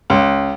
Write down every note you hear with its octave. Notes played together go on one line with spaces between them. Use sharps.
C#2